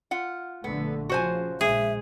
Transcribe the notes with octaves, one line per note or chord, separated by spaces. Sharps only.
F4 F#5
A#1 D3 A3 B3
C#3 F3 F#4 C5 G#5
A#1 G#3 G#4 E5